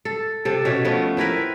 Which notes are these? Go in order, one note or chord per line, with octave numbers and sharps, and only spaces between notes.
A4
C3 A4
B2 C#4 E5
F3 A3 B3
C4 E4 A#4 B4